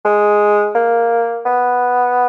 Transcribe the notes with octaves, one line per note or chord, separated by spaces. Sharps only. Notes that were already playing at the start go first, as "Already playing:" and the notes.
G#3
A#3
B3